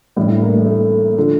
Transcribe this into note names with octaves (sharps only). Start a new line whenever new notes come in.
A1 A2 G3 D4
E4
A#3
A3
A3
D3 F3